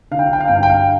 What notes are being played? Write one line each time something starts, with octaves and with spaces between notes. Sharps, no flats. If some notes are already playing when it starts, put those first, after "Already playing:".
D3 F5
G5
F5
G5
F5
G2 G5
F5
G5
F5